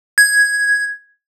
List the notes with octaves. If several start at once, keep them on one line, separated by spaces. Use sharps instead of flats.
G#6